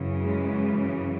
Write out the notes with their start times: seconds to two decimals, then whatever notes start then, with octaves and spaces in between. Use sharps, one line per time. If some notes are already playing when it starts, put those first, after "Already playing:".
Already playing: F#2 C#3 E3
0.21 G#3